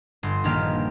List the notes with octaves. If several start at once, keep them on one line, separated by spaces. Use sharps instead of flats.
G1 C6
A#1 D#3 A#3 G4 F6